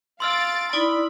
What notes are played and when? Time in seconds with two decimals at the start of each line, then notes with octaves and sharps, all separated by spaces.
0.20 F5 C6 E6 F6 A6 D7
0.73 D#4 E4 D5 B5